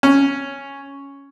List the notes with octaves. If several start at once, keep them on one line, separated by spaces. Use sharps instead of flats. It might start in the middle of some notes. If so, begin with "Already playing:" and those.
C#4